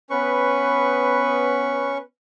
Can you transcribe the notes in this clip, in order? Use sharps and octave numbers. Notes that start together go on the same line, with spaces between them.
B3 C#4 B4 C#6